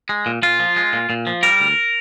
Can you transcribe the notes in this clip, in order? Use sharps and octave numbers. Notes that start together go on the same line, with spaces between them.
G#3
A#2
A#2 F4
F3
G#3
A#2
A#2
F3
G3 A#4
D2